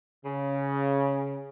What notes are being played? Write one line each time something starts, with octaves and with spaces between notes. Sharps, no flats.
C#3